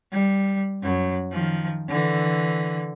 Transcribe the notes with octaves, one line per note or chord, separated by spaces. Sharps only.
G3
F#2 F#3
D#3 F3
D3 E3